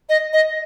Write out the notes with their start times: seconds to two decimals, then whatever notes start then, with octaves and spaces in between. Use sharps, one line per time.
0.09 D#5
0.33 D#5